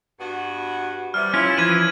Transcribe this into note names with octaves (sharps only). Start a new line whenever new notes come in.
G2 B3 F#4
C3 E3 G3 F6
C#4 E4 F4
E3 F3 B4 G#6 D#7